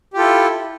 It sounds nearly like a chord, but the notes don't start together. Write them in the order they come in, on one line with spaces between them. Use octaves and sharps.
G4 F4 A4 E4